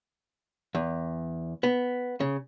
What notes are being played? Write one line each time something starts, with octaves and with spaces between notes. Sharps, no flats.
E2
B3
C#3